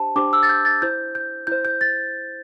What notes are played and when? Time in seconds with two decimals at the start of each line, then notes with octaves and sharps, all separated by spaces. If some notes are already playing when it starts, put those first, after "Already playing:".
Already playing: D4 G4 C5 A5
0.16 D4 G4 C5 D6
0.33 E6
0.43 A6
0.49 G6
0.65 A6
0.82 E4 C5 G6
1.15 G6
1.47 E4 C5 G6
1.65 G6
1.81 A6